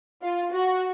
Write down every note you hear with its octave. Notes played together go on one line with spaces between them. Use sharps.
F4
F#4